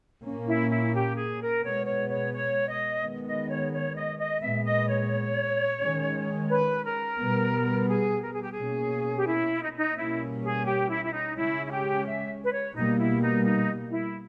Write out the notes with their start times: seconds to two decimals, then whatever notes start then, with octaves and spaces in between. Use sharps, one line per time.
0.24 A#2 A#3 C#4
0.47 E4
0.71 E4
0.94 G4
1.16 G#4
1.40 A#4
1.63 B2 G#3 B3 C#5
1.86 C#5
2.09 C#5
2.33 C#5
2.68 D#5
3.03 D#3 G#3 B3
3.26 D#5
3.49 C#5
3.72 C#5
3.95 D#5
4.18 D#5
4.41 A#2 G#3 B3 E5
4.64 D#5
4.88 C#5
5.80 D#3 G#3 C#4
6.50 B4
6.84 A#4
7.19 B2 G3 B3
7.88 G#4
8.23 A#4
8.33 G#4
8.42 G4
8.52 G#4
8.58 B2 A#3 C#4
9.17 G4
9.28 E4
9.63 D#4
9.77 D#4
9.97 B2 G3 A#3 C#4 E4
10.43 G#4
10.66 G4
10.90 E4
11.04 E4
11.13 D#4
11.36 C#3 G#3 C#4 E4
11.65 E4
11.71 G4
12.06 E5
12.45 B4
12.52 C#5
12.75 B2 G3 A#3 D#4
12.98 E4
13.21 D#4
13.45 D#4
13.91 E4